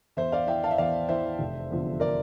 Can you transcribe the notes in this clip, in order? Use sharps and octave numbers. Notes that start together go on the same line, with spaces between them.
E2 C5 E5
D5 F5
E3 E5 G5
F5 A5
E5
E2 D5 F5
E3 C5 E5
F1
E2 D3 F3
A#4 D5